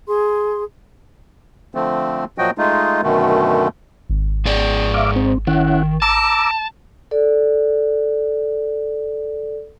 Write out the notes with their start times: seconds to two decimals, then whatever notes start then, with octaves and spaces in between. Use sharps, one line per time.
0.07 G#4 C6
1.75 D3 F3 A3 C4
2.38 A#2 F3 F#3 F#4 D#5 G5
2.58 G#3 A3 D#4 F4
3.03 F#2 B2 D3 D#3 A3
4.09 G#1
4.45 G#2 G#4 D5
4.94 E5 F5 D6
5.16 C4
5.47 D#3 C#4 E4 F#5
6.02 A5 A#5 D6 E6
7.11 A4 D5